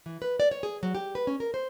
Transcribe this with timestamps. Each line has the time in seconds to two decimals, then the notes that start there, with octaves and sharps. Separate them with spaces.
0.06 E3
0.22 B4
0.40 D5
0.51 C#5
0.63 G#4
0.83 F#3
0.95 G4
1.15 B4
1.27 C#4
1.40 A#4
1.54 C5